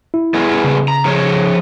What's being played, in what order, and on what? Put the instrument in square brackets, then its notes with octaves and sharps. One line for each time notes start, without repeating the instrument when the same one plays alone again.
[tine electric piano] E4
[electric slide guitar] G3 B3 G#4
[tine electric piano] C#3
[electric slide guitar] A#5
F3 G#4 C#5